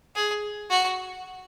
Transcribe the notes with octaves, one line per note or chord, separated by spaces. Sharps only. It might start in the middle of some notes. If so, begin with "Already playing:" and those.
G#4
F#4